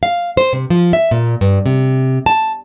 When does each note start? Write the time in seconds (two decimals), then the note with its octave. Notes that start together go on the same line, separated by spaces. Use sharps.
0.03 F5
0.37 C5
0.53 C3
0.70 F3
0.93 E5
1.11 A#2
1.41 G2
1.66 C3
2.26 A5